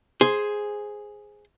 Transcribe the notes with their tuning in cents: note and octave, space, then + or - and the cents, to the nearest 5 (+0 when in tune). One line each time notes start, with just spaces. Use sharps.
G#4 +0 C5 +0